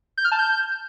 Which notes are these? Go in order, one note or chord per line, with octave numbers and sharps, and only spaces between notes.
G6
F6
A5
G6